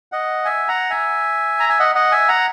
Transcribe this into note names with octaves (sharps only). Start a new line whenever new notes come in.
D#5 F#5
E5 G#5
F#5 A#5
E5 G#5
A#5
G#5
D#5 F#5
D#5 F#5
E5 G#5
F#5 A#5